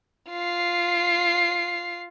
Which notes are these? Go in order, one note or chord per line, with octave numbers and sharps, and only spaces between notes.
F4 C7